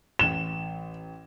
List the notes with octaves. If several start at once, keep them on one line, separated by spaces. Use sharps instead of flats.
A1 E7 G7